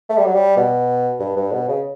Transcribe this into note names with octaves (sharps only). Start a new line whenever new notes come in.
A3
G3
F#3
G3
B2
G2
G2
B2
C#3